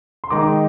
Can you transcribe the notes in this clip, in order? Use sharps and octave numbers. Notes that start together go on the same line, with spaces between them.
C6
D#3 G#3 D#4 A#5 D6